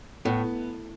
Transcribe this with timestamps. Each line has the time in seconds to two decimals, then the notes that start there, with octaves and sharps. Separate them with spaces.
0.25 A2 B3